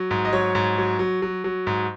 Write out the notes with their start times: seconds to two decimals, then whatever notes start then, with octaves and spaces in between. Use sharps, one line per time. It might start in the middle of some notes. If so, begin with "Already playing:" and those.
Already playing: F#3
0.11 G#2
0.25 D#5
0.33 F#3 C#5
0.55 G#2
0.78 F#3
0.99 F#3
1.22 F#3
1.44 F#3
1.67 G#2